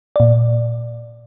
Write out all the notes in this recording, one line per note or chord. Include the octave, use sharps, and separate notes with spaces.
A#2 D5